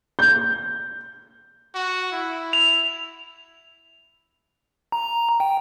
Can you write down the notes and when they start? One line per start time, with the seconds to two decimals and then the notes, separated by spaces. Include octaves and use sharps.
0.19 G6
1.74 F#4
2.12 E4
2.53 F7
4.92 A#5
5.40 G5